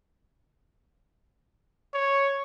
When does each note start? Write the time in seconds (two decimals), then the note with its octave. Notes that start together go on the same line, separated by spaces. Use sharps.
1.94 C#5